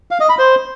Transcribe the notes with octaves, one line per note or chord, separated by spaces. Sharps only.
F5
D#5
B5
C5